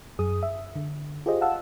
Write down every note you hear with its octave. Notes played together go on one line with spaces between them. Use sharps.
F#2 G#4 D#6
E5
D3
F4 G4 G#4 C5 D#5
F5 F#5 A5 E6